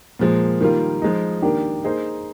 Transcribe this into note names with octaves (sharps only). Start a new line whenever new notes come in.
A#2 F3 G#3
D#3 G3 A#3 F4
F3 G#3 D#4
D#3 A#3 D4 G4
A#3 D#4 G#4 C5